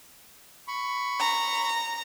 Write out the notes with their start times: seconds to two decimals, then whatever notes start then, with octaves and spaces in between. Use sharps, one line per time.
0.68 B5 C#6
1.20 A#5